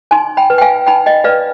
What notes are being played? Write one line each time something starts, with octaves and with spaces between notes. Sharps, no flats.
D#4 G#5 C6
G5 B5
B4
G5
F5 G#5
D#4 G5 B5
D#5 G5
B4 D5 F5